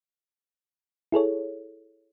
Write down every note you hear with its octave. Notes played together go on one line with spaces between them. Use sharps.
E4 G#4 A4 C#5